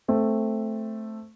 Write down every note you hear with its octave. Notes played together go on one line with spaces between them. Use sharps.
A3 C4